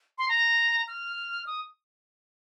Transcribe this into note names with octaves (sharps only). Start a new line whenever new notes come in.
C6
A#5
F6
D#6